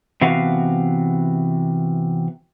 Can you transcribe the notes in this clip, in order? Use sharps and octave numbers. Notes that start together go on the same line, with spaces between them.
C3 E3 B3 F#4 F5